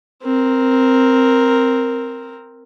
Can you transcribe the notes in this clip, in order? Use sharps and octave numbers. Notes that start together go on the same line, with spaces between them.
C4 A#4